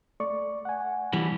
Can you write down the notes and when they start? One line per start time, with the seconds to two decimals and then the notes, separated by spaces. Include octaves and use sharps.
0.20 A3 D5 C#6
0.65 F#5 G#5
1.13 E3 G3